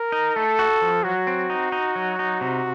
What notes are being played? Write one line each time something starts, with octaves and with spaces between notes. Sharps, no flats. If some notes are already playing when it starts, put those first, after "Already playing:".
Already playing: A#4
D#4
A3 A4
F#4
F3
F#3 F#4
C4
D#4
D#4
F#3
D#4
C3